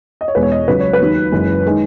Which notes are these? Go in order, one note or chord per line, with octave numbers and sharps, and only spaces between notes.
D#5
C#5
E1 E2 B2 G#3 B4
C#5
D#5
C#2 C#3 F#3 C#4 B4
C#5
B4
D#2 D#3 F#3
F#1 F#2 E3 G#3
D#3 G#3